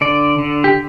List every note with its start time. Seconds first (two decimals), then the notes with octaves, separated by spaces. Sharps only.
0.01 D3 D5
0.38 D3
0.64 G4